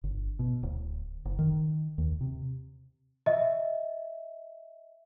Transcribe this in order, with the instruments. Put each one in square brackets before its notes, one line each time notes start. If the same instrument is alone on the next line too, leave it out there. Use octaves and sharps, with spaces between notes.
[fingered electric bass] G1
B2
D1
F#1
D#3
D#2
C3
[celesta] D#5 E5